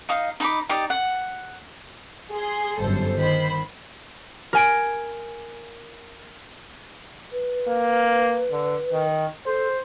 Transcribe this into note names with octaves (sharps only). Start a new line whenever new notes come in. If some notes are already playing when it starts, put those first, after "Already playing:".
D#4 D#5 F5
D#4 B5 D6
D#4 G4 D5
F#5
G#4 C6
G1 F#2 A4 C5
D#3 C5 B5
A#4 G#5 D7
B4
A#3
D3
D#3
A4 C5